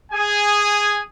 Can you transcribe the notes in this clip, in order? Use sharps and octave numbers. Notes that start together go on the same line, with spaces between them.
G#4 G#5